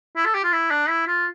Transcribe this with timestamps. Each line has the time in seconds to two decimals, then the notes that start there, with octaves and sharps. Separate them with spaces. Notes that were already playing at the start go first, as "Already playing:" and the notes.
0.16 E4
0.25 A4
0.34 G4
0.44 F4
0.52 E4
0.71 D4
0.89 E4
1.07 F4